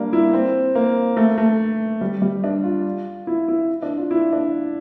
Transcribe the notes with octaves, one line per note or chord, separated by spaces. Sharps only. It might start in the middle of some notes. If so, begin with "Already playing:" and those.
Already playing: G3 A#3 D4
E4
C4
A#3
A3
A3
G3
G3
D4
F4
E4
E4
D4
F4
E4
D4